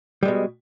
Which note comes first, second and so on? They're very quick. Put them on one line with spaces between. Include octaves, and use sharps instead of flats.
G3 G#3 B2